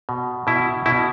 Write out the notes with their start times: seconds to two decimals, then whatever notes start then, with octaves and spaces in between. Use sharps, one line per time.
0.09 B2
0.47 B2 E4
0.86 B2 E4